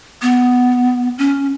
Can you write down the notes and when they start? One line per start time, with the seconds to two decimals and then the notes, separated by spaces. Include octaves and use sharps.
0.22 B3
1.18 C#4